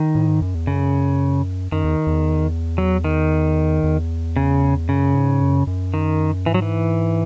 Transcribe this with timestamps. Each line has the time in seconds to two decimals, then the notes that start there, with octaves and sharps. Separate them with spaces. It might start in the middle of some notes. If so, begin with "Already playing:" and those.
Already playing: D#3
0.15 A2
0.28 G#2
0.42 F#2
0.55 E2
0.67 F#2 C#3
1.72 F#2 D#3
1.84 E2
2.07 E2
2.78 F#3
3.04 D#3
3.84 E2
4.36 C#3
4.88 F#2 C#3
5.15 G#2
5.42 F#2
5.67 F#2
5.94 D#3
6.46 G#2 E3
6.54 F#3
6.62 E3